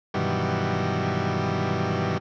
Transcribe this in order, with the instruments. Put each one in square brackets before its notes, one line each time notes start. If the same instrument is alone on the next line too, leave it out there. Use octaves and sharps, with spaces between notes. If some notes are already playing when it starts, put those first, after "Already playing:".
[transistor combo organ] G2 B2 D#3 E3 F#3 G3